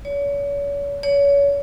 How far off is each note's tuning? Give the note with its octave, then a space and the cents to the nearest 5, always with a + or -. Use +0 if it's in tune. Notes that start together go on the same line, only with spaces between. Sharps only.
C#5 +40
C#5 +30